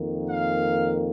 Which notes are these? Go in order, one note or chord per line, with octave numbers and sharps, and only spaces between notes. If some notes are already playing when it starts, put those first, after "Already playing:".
Already playing: F2 D#3 A#3
F5